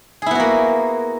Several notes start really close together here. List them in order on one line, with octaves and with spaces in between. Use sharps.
G#4 E4 B3 F#4 A#3